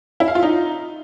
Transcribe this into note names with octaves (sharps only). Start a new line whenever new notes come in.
E4
F5
F4
D#4